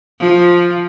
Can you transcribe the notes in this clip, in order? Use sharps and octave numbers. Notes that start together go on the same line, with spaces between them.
F3